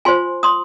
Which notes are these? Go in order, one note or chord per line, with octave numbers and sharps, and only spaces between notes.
F4 C5 G#5 C6
C6 D#6